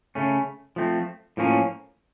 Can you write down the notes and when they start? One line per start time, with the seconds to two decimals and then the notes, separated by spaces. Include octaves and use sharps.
0.15 C#3 A3 C#4
0.76 F3 A3 C4
1.37 A2 F3 A#3 C#4